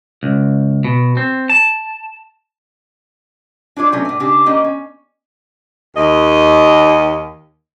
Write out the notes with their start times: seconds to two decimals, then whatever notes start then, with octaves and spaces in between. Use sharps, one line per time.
0.23 C#2
0.84 B2
1.17 C4
1.50 A5
3.76 D4 F4 C#5 D5
3.92 C3 F#3 A3 B3 C#4
4.05 A2 D5
4.20 C#3 D4 G4
4.46 A#3 C#4 G4 D#5
4.64 C#4
5.96 D#2 D#5